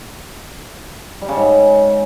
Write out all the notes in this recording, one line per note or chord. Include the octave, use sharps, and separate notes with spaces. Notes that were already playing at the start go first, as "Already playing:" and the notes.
G3
C#3
G#2